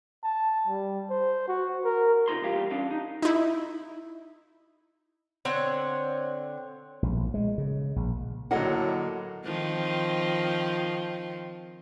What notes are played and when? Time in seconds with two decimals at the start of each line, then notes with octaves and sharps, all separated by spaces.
0.24 A5
0.68 G3
1.10 C5
1.48 F#4
1.85 A#4
2.28 C3 D#4 F4 A#4 C6
2.42 E2 A#2 E3 G3 G4 F5
2.70 C#4 D4 F5
2.87 D4 D#4
3.22 D#4 E4
5.45 D3 C4 C#5 F#5
7.02 A#1
7.34 G#3
7.58 C#3
7.96 A#1
8.51 A2 D3 F#3 A#3 D#5 F#5
9.45 D#3 F3 C4